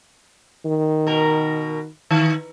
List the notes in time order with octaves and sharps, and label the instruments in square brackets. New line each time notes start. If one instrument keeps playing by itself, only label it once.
[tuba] D#3
[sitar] B2 A#4
D#3